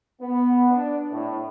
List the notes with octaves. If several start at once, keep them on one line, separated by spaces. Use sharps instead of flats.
B3
D4
A2